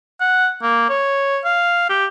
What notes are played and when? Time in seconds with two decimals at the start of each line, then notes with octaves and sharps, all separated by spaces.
0.20 F#5
0.62 A#3
0.89 C#5
1.45 F5
1.90 G4